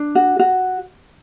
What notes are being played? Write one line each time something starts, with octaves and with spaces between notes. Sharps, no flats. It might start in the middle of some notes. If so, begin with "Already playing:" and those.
Already playing: D4
F#4
F#4